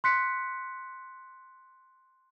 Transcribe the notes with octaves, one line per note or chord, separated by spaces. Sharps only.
C6 F#6 B6 C#7